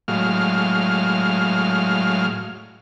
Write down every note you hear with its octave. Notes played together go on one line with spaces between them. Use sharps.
A2 F#3 G#3 F5 F6